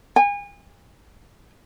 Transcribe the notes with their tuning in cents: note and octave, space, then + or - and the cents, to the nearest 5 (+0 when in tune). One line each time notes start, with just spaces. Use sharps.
G#5 -35